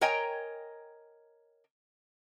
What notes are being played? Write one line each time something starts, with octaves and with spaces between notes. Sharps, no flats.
A#4 C#5 D#5 G5 G#5 A#5